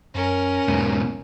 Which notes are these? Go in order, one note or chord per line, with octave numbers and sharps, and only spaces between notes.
F#2 C#4 A#4
E2 G#2 B2